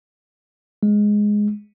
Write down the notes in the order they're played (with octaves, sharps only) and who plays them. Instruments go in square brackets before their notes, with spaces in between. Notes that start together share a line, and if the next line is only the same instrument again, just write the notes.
[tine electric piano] G#3